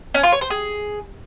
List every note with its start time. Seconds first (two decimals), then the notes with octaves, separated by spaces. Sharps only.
0.14 C#4
0.23 F4
0.32 C#5
0.41 C5
0.50 G#4